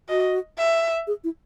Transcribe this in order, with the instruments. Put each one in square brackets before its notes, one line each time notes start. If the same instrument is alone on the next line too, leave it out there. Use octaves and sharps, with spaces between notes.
[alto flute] F#4 [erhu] D#5
[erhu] E5
[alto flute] G#4
E4